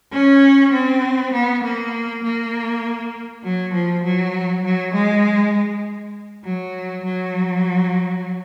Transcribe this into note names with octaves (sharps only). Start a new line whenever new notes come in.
C#4
C4
B3
A#3
A#3
F#3
F3
F#3
F#3
G#3
F#3
F#3